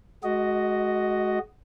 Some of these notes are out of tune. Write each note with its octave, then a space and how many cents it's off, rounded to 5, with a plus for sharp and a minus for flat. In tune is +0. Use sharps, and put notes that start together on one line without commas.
G#3 +30 F#4 +10 D#5 +0